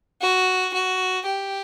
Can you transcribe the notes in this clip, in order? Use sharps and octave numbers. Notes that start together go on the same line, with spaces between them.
F#4
F#4
G4